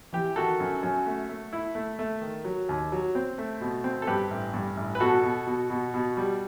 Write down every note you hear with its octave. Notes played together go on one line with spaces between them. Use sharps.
E3 G4
D#3 F#4 A4
F#2
F#2
A3
A3
E4
A3
A3
D#3
F#3
D#2
F#3
C4
A3
B2
C4
A4
G2 G4 B4
A1
G2
A1
B4
B2 F#4 A4
B2
B2
B2
B2
G3